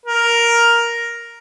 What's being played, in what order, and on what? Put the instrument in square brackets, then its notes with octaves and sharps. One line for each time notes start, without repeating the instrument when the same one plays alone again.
[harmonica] A#4